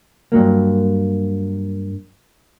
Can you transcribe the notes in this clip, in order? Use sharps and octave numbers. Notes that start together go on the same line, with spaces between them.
G2 F#3 A#3